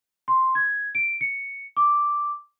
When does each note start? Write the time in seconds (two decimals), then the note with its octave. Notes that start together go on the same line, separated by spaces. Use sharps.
0.28 C6
0.55 G#6
0.95 D7
1.21 C#7
1.77 D6